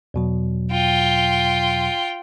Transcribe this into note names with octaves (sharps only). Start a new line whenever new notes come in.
E2 B2 F#3
F4 G5